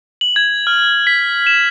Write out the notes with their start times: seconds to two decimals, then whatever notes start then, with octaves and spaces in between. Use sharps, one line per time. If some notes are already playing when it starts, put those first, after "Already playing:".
0.21 F#7
0.36 G#6
0.67 F6
1.07 B6
1.47 E7